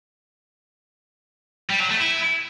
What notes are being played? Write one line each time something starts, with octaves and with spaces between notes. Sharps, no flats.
G3
F#3
A3
E4